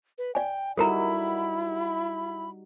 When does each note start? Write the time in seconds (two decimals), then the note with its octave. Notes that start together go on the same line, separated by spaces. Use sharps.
0.18 B4
0.35 D5 G5 G#5
0.77 G3 D#4 E4 F#4 A4 A#4 A#5 B5
1.75 B5